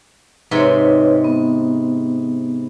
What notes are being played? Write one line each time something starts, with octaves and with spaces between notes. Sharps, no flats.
G#2 C3 B4 C#5 C6
B3